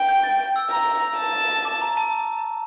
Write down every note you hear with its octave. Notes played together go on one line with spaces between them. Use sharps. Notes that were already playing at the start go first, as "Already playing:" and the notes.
Already playing: G5
G6
A6
G6
E6
A#5 E6
A5
D6
A#5
A5